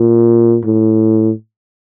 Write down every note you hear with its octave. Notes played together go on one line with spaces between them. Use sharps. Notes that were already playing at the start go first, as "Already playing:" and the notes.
Already playing: A#2
A2